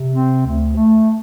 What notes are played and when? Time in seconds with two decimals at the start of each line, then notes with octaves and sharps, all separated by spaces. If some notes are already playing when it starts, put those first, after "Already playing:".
Already playing: C3
0.13 C4
0.46 D2
0.77 A3